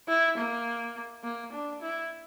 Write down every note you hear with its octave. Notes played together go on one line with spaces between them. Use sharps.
E4
A#3
A#3
D4
E4